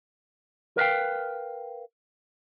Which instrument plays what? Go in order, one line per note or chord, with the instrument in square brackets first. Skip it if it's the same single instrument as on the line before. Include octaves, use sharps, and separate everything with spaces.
[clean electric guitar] A#4 B4 E5 F5 G5